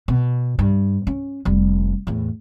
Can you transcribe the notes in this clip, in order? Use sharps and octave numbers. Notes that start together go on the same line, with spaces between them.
B2
G2
C#4
F1 G3
E2 A2